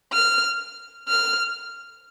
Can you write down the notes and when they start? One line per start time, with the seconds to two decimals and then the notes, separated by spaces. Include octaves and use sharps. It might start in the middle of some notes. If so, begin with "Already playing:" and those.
0.13 F6
1.08 F6